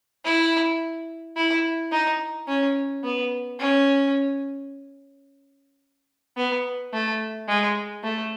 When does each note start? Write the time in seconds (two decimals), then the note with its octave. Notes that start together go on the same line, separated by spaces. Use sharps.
0.25 E4
1.36 E4
1.92 D#4
2.47 C#4
3.04 B3
3.59 C#4
6.37 B3
6.93 A3
7.48 G#3
8.04 A3